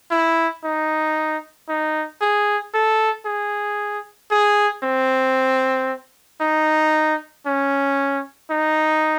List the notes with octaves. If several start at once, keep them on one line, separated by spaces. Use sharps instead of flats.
E4
D#4
D#4
G#4
A4
G#4
G#4
C4
D#4
C#4
D#4